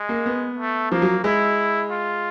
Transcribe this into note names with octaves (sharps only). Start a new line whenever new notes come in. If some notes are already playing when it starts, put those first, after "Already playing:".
Already playing: G#3
A#3
B3
A3
F3 A#3
F#3
G#3 E4
F4